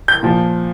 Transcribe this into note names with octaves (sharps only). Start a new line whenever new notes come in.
G6
A#2 F3